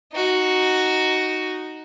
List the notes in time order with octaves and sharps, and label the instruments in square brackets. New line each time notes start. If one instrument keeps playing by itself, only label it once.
[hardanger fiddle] D#4 F#4